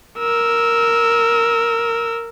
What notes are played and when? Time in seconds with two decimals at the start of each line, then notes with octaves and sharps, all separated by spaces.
0.19 A#4 E6